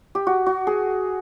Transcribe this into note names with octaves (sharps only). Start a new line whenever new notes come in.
G4
F#4
F#4
G#4